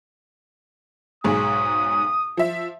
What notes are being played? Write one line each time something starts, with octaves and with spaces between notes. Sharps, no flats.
B1 G#2 G#4 D#6
F3 E5